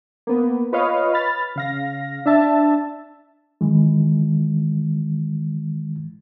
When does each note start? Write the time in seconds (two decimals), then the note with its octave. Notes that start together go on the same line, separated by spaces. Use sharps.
0.27 A#3 B3
0.72 F4 B4 C#5 D#5 F5
1.13 B5 F6 A6
1.56 C#3 F5 A#6
2.26 D4 E5 A5
3.61 D#3 E3 G#3